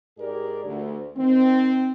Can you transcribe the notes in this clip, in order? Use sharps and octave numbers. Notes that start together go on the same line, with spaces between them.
G#2 G4 G#4 A#4 D5
D2
D#3 C4